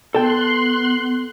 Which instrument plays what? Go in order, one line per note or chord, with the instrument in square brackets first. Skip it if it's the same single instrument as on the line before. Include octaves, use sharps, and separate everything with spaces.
[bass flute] B3 [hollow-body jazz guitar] A4 G5 [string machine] C6 F#6